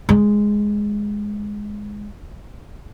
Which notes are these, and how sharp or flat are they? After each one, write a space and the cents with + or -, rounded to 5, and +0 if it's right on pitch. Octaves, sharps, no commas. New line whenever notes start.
G#3 +0